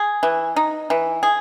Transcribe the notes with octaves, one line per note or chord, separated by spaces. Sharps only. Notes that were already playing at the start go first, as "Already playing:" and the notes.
Already playing: G#4
E3
D#4
E3
G#4